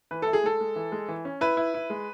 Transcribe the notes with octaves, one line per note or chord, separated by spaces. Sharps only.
E3 B4
E4 A4
G#4
G#3 A4
G#3
E3
G#3
E3
C#4
E4 B4
E4
E4
G#3